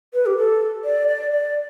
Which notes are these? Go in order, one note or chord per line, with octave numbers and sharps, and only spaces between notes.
B4
G4
A4
D5
D5
D5